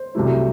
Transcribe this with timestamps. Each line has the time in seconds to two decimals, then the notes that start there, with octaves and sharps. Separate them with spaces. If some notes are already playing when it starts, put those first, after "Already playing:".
Already playing: C5
0.15 C2 C3 F#3 A3 E4